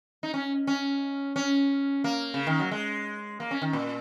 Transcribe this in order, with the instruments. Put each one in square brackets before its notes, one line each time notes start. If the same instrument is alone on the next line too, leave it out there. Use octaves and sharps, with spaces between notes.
[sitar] D#4
C#4
C#4
C#4
A#3
C#3
D#3
F#3
G#3
A#3
C#4
D#3
A#2